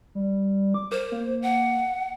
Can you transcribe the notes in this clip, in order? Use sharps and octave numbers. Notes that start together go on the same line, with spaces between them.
G3
D6
A#4 C5
A#3
F#5